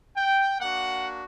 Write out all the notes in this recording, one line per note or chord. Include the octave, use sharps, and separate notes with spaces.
G5
A#3 D4 F#4 F#5